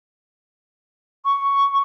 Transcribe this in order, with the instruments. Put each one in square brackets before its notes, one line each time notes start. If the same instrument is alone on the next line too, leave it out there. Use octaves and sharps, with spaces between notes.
[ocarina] C#6